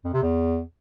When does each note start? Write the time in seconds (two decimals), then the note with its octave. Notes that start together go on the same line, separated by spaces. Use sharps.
0.04 F2
0.13 C3
0.22 E2